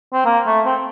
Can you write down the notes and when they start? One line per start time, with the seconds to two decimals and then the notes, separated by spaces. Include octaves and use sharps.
0.13 C4
0.25 A#3
0.46 A3
0.66 C4